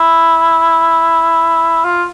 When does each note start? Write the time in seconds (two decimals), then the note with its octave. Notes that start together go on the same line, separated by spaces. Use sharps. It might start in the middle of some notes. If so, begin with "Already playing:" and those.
Already playing: E4
1.84 F4